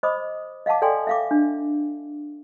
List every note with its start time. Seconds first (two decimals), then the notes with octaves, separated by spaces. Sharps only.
0.03 C5 D#5 B5 D6 D#6
0.66 D#5 F5 F#5 A5 D6
0.82 A4 D5 G5 G#5 C6
1.07 E5 F5 D6
1.31 D4